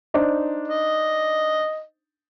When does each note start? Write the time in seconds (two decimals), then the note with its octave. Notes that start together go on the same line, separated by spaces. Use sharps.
0.14 D4 D#4 C5
0.68 D#5